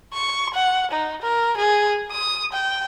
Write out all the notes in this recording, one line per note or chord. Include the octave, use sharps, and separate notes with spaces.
C#6
F#5
D#4
A#4
G#4
D#6
G5